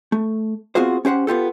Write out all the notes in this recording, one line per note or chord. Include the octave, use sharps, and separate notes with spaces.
A3
B3 C4 F4 F#4 G#4 C5
C#4 G4 C5 F#5
B3 F4 G4 A4